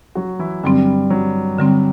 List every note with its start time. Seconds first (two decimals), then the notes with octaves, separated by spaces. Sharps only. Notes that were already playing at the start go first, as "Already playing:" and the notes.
0.15 F#3 F#4
0.39 E3 E4
0.63 G2 D3 F#3 G3 C4
1.10 F#3
1.59 D3 G3 C4